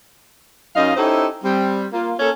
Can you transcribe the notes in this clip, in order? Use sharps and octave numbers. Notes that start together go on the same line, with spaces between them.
F#2 C#4 D#4 F4 D#5 F5
C#4 D#4 E4 G4 A4 C5
G3 C4
A#3 F4
A#3 C#4 A4